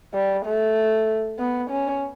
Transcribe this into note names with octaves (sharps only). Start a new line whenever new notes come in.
G3
A3
B3
C#4